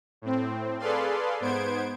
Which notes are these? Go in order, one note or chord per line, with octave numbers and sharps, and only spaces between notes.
A2 C4
G#4 A4 B4 D5 F5 C6
G#2 B3 C5 G#6 D7